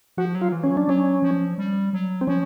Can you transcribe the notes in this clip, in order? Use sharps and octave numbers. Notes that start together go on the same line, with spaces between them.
F3 F#4
F#3
F4
E3
C#4
F#3
D4
F#3 C#4
F3
G3
F#3
C4
F3 C#4